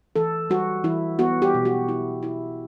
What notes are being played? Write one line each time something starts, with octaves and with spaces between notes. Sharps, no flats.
E3 A4
G3 F#4
E3 E4
B3 F#4
G4
B2
F#4
E4
E4